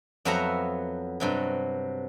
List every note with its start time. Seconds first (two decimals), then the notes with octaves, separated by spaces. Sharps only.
0.25 F2 F#3 B3 E5 F#5 A#5
1.20 G2 C3 F#3